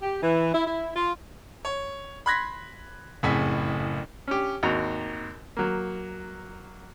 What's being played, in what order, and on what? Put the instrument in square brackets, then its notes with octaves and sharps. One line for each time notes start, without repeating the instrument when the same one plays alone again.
[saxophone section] G4
E3
E4
E4
F4
[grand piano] C#5
B5 C6 F#6 G#6 A#6 B6
F#1 F2 A2 G#4 G#5 B6
[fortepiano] C#4 G4
G#1 D#2 F#4 A#5
F#3 A#3